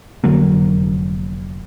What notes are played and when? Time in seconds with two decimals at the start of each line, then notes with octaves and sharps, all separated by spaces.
0.24 F1 D3 F#3 A#3